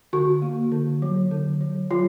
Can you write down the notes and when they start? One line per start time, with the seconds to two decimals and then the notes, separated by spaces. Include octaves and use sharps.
0.13 D3 F#4
0.42 A#3
0.72 D3
1.02 F#3
1.31 D3
1.61 F#3
1.91 F#3 F4